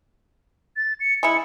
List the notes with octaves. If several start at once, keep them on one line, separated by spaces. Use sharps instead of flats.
A6
C#7
G#3 E4 C#7